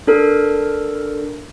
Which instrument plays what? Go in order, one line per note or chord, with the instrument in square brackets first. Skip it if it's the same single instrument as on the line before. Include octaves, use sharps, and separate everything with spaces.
[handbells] D4 A4 A#4